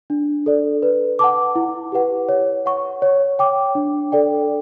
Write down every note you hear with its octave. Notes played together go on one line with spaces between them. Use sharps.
D4
A4 D5
B4
F#5 A5 D6
E4
G4 B4 F#5
C#5
F#5 C#6
C#5
G5 D6
D4
A4 D5 G5